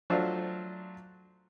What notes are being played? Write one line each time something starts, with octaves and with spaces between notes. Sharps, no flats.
F#3 A3 D4 F4 C5 D5